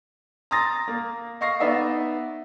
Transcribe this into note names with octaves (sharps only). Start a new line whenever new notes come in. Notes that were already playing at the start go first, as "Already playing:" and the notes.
A#5 C6 D#6 A6 A#6
A#3
D#5 F5 C#6 A#6 C7
B3 D#4 D5 E5